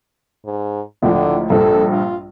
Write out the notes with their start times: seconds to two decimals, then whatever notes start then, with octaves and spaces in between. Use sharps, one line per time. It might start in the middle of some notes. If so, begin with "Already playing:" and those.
0.45 G#2
1.03 C#2 A2 D3 F3
1.50 A#1 G2 A4
1.91 F4